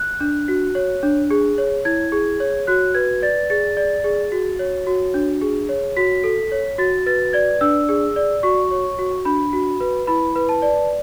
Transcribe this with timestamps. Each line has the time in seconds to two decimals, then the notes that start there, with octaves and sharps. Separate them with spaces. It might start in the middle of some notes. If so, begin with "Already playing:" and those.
Already playing: F#6
0.20 D4
0.48 F#4
0.75 C#5
1.03 D4
1.31 G#4
1.58 C#5
1.85 E4 G#6
2.12 G#4
2.40 C#5
2.67 F#4 F#6
2.94 B4 G#6
3.22 D5 A6
3.50 G#4 A6
3.77 D5
4.04 G#4
4.32 F#4
4.59 C#5
4.87 F#4
5.14 D4
5.41 G#4
5.69 C#5
5.97 F#4 B6
6.24 A4
6.52 C#5
6.78 F#4 A6
7.06 B4 A6
7.33 D5 G#6
7.61 D4 E6
7.89 G#4
8.16 D5
8.43 F#4 C#6
8.71 C#5
8.98 F#4
9.25 D4 B5
9.53 F#4
9.80 B4
10.07 E4 B5
10.35 B4
10.49 A5
10.62 D5